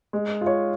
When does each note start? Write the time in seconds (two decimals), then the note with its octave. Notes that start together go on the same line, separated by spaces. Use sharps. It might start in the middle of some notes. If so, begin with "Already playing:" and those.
0.13 G#3
0.41 F4
0.46 C#5